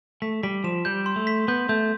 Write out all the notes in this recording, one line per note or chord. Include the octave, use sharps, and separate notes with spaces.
A3 B6
G3 B6
F3 E7
G3 G6
C6
A3
B6
B3 G6
A3 G6